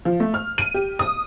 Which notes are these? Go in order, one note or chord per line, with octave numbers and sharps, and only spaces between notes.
F3
A3
F6
D#7
G4
D#6